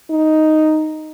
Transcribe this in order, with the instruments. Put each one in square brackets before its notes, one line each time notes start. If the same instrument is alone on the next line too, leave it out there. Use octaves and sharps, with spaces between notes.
[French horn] D#4